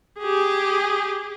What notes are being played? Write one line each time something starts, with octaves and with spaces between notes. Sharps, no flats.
G4 G#4